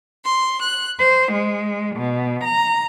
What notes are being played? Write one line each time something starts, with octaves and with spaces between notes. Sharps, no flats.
C6
F#6
C5
G#3
B2
A#5